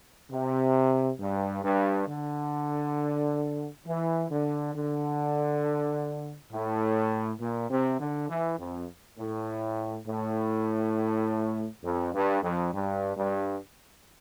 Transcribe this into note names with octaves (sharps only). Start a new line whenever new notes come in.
C3
G2
G2
D3
E3
D3
D3
A2
A#2
C3
D3
E3
F2
A2
A2
F2
G2
F2
G2
G2